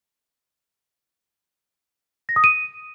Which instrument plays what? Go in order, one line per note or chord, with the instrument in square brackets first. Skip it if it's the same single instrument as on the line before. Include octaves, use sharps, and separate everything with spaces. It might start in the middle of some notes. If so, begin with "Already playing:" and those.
[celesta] A#6
D#6
D#7